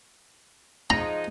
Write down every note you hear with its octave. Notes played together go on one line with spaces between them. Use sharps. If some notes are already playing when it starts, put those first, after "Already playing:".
F3 G#3 D#4 A#5